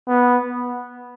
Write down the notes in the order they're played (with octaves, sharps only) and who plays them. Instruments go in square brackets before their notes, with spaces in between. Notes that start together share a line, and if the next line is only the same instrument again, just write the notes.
[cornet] B3